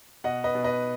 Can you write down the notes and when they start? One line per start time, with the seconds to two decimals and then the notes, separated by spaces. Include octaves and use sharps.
0.24 B2 D#5 F#5
0.44 B4 D#5
0.55 B2
0.64 B4 D#5